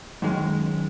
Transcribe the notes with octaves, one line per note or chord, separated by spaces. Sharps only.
F#2 D#3 G#3